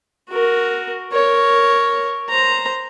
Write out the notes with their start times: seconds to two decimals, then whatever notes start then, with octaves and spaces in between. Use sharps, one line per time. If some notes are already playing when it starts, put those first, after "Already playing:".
0.30 F#4 A#4
1.13 A#4 C#5
2.29 C5 A#5